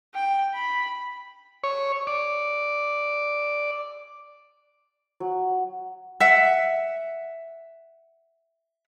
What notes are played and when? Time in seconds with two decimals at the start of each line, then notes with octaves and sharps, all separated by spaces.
0.15 G5
0.54 B5
1.64 C#5
2.07 D5
5.20 F#3
6.20 E5 F#5